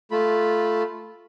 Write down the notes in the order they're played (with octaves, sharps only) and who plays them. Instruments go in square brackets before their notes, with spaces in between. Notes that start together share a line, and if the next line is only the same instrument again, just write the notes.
[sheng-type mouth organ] A3 F4 B5